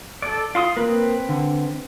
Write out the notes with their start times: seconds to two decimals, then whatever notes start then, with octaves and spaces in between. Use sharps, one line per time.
0.22 A4 D5
0.55 F4 F5 C6 D#6
0.77 A#3 C4 B4
1.29 D3